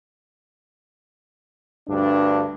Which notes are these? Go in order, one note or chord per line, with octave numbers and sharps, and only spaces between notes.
D2 G2 D4